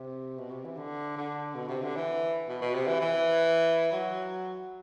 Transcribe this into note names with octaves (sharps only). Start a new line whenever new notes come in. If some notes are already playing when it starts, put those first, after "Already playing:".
Already playing: C3
B2
C3
E3
D3
D3
B2
C3
D3
E3
B2
B2
C3
E3
E3
F#3